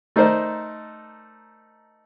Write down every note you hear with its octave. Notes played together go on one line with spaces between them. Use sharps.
A3 D#4 A4 A#4 C5 D5